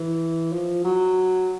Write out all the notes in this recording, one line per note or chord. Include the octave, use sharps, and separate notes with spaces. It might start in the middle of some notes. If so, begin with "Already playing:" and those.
Already playing: E3
F3
F#3